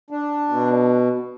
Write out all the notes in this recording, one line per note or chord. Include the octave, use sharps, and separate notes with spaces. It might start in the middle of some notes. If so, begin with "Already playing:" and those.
D4
B2